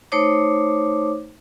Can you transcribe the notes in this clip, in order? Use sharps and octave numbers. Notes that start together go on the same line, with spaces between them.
A3 D#4 C5 C#5 D6